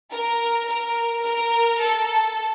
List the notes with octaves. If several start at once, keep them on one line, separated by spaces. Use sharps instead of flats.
A#4
A#4
A#4
A4